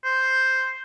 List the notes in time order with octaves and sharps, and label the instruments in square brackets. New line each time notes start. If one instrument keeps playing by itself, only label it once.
[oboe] C5